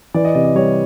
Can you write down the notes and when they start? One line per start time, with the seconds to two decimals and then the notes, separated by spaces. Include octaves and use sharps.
0.14 E3 D5
0.25 D#5
0.35 C3 D#5
0.44 D5
0.55 G3 C#5